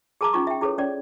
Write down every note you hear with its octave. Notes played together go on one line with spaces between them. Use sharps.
G#4 A#4 A5 A#5 D6
C#4 D#4 F4 C#6
E5 G5
E4 G#4 A4 B4 C#5
C#4 C#5 D5